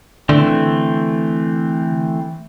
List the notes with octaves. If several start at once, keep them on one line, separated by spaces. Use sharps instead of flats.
D3 E3 A3 C4